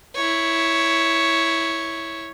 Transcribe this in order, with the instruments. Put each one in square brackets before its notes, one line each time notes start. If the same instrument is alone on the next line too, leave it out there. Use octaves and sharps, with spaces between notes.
[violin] E4 C#5